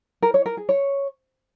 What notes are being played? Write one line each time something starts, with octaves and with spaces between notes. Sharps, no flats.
A#4
C#5
A#4
G#4
C#5